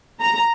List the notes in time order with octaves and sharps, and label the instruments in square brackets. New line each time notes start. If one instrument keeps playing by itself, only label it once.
[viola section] A#5